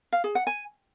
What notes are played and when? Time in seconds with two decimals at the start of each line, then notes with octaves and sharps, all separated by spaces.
0.13 F5
0.24 G#4
0.35 F#5
0.47 G#5